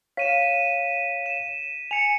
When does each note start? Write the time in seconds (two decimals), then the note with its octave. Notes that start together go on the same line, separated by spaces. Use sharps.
0.17 C#5 F5 B6 D#7 E7
1.26 E7
1.91 G#5 C#7 F7